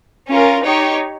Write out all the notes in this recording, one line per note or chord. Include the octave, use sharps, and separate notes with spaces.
C#4 F4 A#4
D#4 G4 C#5